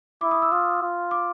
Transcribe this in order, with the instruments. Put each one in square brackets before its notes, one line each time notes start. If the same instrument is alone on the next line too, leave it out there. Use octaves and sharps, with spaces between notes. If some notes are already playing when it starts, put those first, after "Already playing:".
[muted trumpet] E4 [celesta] D6
[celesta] D#6
E6
[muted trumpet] F4 [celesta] D#6
[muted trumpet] F4
[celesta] D6